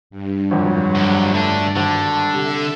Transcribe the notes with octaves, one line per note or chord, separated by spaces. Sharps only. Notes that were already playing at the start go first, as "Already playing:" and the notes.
G2
G#1 F2 A#2 F#3
D2 D3
D3 A3 D4
G#1 D3 A5
C3 A4 E5